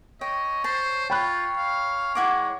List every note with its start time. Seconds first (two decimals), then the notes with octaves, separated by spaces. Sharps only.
0.21 C#5 D#5 G5
0.64 C5 A5
1.10 F4 C#5 G5 B5 F#6
1.57 F5
2.15 G#3 E4 F#5 D6